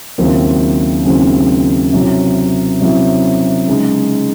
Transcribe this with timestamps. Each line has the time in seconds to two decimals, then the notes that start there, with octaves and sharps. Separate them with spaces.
0.18 D#2 C#3 F#3 C4 E4
1.05 D#2 C#3 F#3 C4 E4
1.93 C3 F#3 C#4 E4
2.81 C3 F#3 C#4 E4
3.67 C#3 G#3 D#4